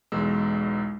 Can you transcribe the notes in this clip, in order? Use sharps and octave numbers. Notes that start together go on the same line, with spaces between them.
B1 E2 G#3 E6